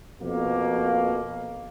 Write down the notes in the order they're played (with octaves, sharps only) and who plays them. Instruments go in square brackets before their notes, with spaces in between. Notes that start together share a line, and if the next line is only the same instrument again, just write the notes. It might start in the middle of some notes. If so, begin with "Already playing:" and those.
[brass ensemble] F2 B2 A#3